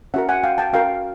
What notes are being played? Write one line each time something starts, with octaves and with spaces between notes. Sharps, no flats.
C#4 F#4 A#4 E5 F#5
F#5 G#5
F5 G5
G5 A5
C#4 F#4 A#4 F5 G5